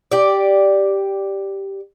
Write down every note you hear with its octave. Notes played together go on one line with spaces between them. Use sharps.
G4 D5